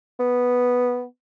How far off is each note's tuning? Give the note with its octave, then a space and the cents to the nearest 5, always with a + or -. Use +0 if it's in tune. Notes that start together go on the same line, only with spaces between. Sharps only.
B3 -5